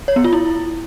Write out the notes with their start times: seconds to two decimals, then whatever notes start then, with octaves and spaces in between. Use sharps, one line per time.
0.08 C#5
0.16 B3
0.24 F4
0.33 E4